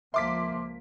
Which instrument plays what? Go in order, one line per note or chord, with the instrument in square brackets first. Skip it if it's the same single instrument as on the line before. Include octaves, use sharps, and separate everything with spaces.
[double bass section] C#2 F3 A#3 [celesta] E5 [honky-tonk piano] C6 D6 B6